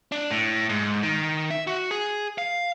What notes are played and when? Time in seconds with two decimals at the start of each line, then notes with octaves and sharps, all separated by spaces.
0.12 D4
0.31 A2
0.69 G#2
1.03 D#3
1.50 E5
1.67 F#4
1.91 G#4
2.38 F5